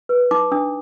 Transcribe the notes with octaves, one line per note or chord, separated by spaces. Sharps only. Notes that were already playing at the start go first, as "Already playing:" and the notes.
B4
D#4 D6
D4 D#6